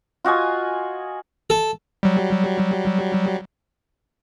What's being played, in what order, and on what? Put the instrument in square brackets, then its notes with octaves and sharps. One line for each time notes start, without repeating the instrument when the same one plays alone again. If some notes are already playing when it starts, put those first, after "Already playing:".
[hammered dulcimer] F4 F#4 D#5 G#5
[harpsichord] A4
[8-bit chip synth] F#3 G3